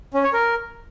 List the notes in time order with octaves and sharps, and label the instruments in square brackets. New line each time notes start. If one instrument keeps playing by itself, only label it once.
[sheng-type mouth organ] C#4
C#5
A#4